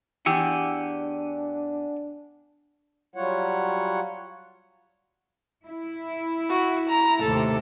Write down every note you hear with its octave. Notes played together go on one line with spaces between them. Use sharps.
E2 D4 G4 F#5 G#5 E6
F#3 G3 F4 C#5 F#5
E4
F#4
A#5
D#2 A2 C3 A4